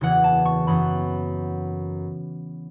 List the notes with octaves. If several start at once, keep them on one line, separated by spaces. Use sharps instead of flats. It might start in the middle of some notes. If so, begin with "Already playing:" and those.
F#1 E2 E3 F#5
A5
C#6
F#2 E3 B3 B5